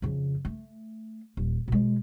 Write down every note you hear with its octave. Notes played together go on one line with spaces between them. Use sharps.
F2 C#3
A3
D#1
B2 G#3